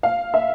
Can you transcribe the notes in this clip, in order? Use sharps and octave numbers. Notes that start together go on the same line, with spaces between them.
F5
E5